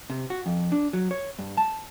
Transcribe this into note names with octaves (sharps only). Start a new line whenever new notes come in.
C3
F#4
F2
D4
F#3
C#5
G2
A5